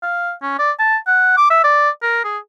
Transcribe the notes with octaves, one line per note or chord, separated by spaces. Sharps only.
F5
C#4
D5
A5
F#5
D6
E5
D5
A#4
G#4